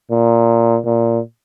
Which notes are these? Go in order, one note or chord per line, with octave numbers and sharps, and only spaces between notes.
A#2
A#2